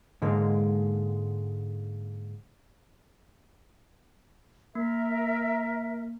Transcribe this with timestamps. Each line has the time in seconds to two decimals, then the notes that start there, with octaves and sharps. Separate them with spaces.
0.22 G#2 D3 G#3 A#3
4.75 A#3 A#4 E5